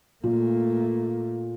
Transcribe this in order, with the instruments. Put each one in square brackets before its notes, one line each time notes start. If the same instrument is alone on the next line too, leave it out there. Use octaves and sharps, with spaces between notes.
[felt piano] A#2 [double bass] A3 A#3